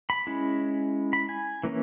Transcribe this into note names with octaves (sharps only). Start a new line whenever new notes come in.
B5
G#3 C#4 E4
B5
G#5
E3 A#3 C#4